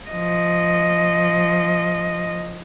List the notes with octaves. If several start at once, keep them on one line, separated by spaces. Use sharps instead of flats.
F3 D#5